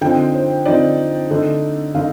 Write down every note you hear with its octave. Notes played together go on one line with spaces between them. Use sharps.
D3 F3 C4 D#4 G5
C5
D3 F3 C4 D#4 D5
D3 A3 D#4
D3 A3 D#4 F5